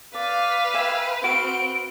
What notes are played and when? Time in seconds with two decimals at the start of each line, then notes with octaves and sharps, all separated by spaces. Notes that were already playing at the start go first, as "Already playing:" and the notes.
0.14 B4 D5 F5
0.74 E5 G5 G#5
1.24 C4 F#4 B4 F5 D7